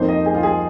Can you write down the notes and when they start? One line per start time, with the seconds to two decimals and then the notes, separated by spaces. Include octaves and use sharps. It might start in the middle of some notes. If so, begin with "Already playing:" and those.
Already playing: F2 F3 A#3 D#4 C5
0.09 D#5
0.26 G#4
0.35 F4
0.43 G#4